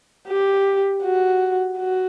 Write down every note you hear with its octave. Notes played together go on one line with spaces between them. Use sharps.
G4
F#4
F#4